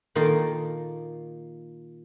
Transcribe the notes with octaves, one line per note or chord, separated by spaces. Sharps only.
A#2 D#3 A#3 A#4 A5